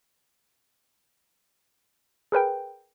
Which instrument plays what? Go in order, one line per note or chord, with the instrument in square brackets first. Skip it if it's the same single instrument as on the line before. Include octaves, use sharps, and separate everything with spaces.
[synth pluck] G#4 A#4 B4 G5